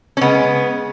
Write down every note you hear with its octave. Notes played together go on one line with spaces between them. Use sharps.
C#4
C#3 G#3 B3